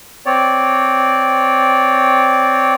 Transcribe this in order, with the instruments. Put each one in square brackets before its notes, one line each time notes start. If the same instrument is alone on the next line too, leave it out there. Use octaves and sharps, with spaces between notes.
[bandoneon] C4 C#5 D5